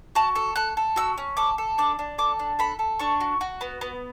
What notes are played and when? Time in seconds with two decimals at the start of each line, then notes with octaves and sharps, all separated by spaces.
0.15 F#4 A5
0.36 A4
0.56 A4 F#6
0.77 A4
0.96 F#4 E6
1.18 C#4
1.37 A4 D6
1.58 A4
1.78 D4 D6
1.99 D4
2.18 A4 D6
2.39 D4
2.59 A4 B5
2.79 A4
2.99 D4 C#6
3.21 F#4
3.41 F#4
3.61 B3
3.81 B3